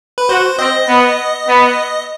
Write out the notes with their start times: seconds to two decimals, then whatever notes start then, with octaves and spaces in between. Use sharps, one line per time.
0.18 B4
0.29 F#4 C5
0.59 C4 D#5
0.88 B3
1.47 B3